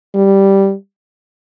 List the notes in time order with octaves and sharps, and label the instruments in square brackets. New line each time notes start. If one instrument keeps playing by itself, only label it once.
[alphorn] G3